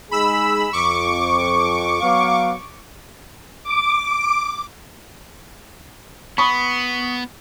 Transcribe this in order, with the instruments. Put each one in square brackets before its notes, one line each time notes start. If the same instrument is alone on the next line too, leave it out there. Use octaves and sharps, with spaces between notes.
[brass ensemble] G#3 D#4 G#4 [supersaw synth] B5 E6
[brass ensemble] F2 [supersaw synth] C#6 D6
[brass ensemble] F#3 B3 F5
[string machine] D6
[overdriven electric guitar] B3 [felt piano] B5 C#6 D#6